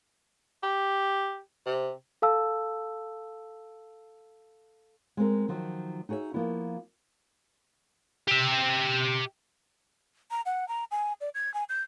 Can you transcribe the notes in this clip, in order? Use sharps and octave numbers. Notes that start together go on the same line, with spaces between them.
G4
C3
A4 F5 A5 E6
G#3 B3 C4 A#4
D#3 F3 F#3
D#4 F#4 G#4 C#5 E5
F3 A#3 B3 E4
G4 E5
A#5
F#5
A#5
G#5
D5
G#6
G#5
G6